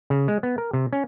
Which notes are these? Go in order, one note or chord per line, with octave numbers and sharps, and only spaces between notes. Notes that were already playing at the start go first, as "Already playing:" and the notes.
C#3
G#3
B3
A#4
C3
C#4